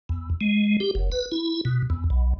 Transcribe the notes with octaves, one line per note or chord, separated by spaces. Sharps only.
E2
G#3
G4
F#1
B4
E4
B2
E2
B1